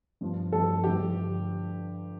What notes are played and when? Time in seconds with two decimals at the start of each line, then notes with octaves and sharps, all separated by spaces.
0.21 G2 F3
0.53 G2 F3 A4
0.84 G2 D3 F3 G4